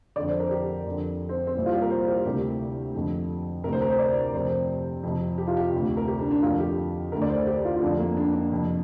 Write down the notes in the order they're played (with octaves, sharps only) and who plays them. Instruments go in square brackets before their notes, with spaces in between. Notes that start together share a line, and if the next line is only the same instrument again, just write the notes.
[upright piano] F2 D3 D5
C5
A#4
G4
F2 D3
C4
C4
C2 A#2
F4
G4
A#4
C5
G4
D2 C3 G4
F2 D3
D2 C3 A#4
C5
A#4
C5
D5
F2 C3 C5
F2 C3
G4
F4
G4
D2 C3
A#4
G4
D4
D4
F2 D3 F4
G4
D3 A#4
D2
D5
C5
G4
F4
F4
F2 D3 D4
A#3
D4
D4
F2 C3